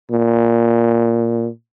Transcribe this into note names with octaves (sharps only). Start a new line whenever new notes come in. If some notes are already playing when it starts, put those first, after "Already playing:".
A#2